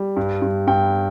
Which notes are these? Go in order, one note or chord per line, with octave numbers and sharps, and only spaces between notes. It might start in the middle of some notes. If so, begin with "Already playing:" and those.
Already playing: G3
G2
G2
G2 G5